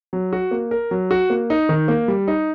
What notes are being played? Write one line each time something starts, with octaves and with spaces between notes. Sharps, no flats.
F#3
F#4
A#3
A#4
F#3
F#4
A#3
D#4
D#3
A#3
G3
D#4